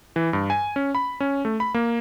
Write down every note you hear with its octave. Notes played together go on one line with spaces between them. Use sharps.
E3
G2
G#5
C#4
B5
C#4
A3
B5
A#3